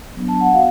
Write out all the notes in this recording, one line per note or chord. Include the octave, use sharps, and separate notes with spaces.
F#3 B3 D4
A5
F#5
B3 F#4 F5